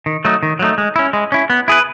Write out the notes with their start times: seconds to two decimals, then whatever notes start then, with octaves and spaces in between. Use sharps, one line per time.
0.06 D#3
0.25 F#3 A3 D#4
0.43 D#3
0.59 F#3 A3 D#4
0.78 G#3
0.96 C#4 E4
1.13 G#3
1.32 C#4 E4
1.50 B3
1.68 E4 G#4 B4